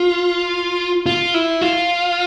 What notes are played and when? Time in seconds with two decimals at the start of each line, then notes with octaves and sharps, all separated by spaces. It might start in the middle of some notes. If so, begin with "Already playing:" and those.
Already playing: F4
1.06 F4
1.34 E4
1.61 F4